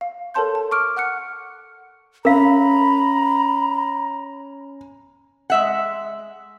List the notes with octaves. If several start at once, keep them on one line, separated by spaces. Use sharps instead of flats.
F5
A4 A#4 C#5 A5 C6 G6
A5
C#6 D6 F6 D7
F#5 F6 F#6 C#7
C#4 A#4 F5 A#5 B5
G#3 E5 F#5